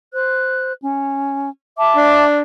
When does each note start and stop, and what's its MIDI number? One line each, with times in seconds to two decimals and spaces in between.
0.13 0.72 72
0.13 0.72 90
0.82 1.50 61
1.78 2.24 76
1.78 2.24 81
1.78 2.24 86
1.96 2.41 62